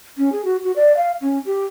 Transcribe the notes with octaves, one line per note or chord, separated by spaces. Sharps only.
C#4
G#4
F#4
F#4
D5
F5
C#4
G4